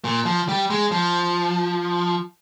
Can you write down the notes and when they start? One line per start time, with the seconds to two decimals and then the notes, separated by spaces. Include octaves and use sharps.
0.04 A#2
0.25 F3
0.49 G3
0.70 G#3
0.92 F3